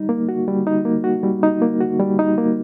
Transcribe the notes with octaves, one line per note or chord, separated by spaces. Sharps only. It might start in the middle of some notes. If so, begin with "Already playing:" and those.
Already playing: G3 D#4
A#3
F#4
G3
D#4
A#3
F#4
G3
D#4
A#3
F#4
G3
D#4
A#3